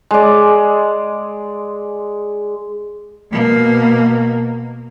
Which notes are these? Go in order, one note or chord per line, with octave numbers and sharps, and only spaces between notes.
G#3 D5
B2 A#3